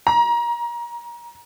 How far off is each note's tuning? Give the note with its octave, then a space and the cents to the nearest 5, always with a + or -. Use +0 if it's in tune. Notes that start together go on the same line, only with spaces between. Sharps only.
A#5 +25